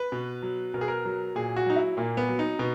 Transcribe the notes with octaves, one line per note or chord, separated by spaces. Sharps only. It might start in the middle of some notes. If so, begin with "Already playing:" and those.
Already playing: B4
B2
F#3
B2 A#4
G#4
A#4
F#3
A#2 G#4
F#4
F#3 D#4
E4
A#2 A#3
B3
F#3
D#4
B2